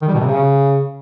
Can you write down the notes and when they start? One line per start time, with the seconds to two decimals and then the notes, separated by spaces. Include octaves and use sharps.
0.02 D#3
0.08 G3
0.14 B2
0.20 C3
0.26 C#3